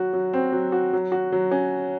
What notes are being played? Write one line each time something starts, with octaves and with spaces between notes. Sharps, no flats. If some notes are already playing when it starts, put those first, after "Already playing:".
Already playing: F#3 F#4
F#3
C4
F#3
F#4
F#3
F#4
F#3
C#4